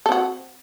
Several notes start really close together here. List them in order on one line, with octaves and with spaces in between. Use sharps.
A4 C4 F#4